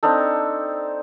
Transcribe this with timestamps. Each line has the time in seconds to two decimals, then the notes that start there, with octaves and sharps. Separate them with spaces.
0.03 C4 D4 D#4 A4